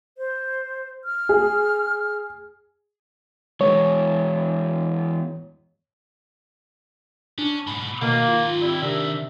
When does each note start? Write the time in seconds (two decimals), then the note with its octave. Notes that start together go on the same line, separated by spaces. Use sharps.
0.18 C5
1.04 F6
1.29 G#4
3.61 E2 G#3 C#5
7.38 C#4 D4
7.67 G#2 B2 B5
8.02 B2 D#3 A#3 B4
8.28 F4
8.62 G3 C4 E4
8.82 C3 D4 A#4 E5